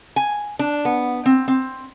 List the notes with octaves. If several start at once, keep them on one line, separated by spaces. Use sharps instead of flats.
G#5
D4
B3
C4
C4